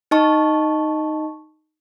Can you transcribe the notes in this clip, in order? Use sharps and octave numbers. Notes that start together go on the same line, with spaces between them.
D#4 D#5 A5 C#6